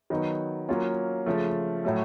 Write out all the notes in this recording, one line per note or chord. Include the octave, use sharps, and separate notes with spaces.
D#3 F#3 B3 D#4
F#3 A#3 C#4 F4
C#3 F3 A3
A2 F#3 A3 C#4